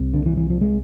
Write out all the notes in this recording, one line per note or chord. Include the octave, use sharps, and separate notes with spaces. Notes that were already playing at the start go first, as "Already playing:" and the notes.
Already playing: C2 C3
D3
E3
E3
F3
G#3